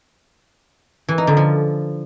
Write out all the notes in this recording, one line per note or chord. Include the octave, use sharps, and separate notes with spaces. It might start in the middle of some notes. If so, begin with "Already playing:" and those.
E3
D#4
D3
F3